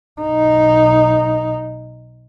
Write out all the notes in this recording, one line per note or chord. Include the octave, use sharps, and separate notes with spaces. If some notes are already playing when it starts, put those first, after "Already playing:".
B1 D#4